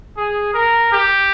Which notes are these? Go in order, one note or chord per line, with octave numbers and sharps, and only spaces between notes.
G#4
A#4
G4